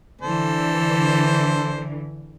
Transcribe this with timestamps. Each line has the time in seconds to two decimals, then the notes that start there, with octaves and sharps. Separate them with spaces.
0.21 D3 E3 A4 C5